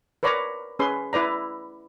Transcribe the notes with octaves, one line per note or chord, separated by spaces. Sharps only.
A#4 B4 C#5 D5 A#5
C#4 G#4 B4 C6
E4 B4 D5 A#5